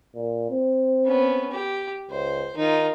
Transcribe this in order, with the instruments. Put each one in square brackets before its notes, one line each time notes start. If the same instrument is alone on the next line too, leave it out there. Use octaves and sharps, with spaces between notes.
[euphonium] A#2
C4
[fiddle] B3 C#4
G4
[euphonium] C#2 [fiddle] C5
[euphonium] D#3 [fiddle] D#4 F4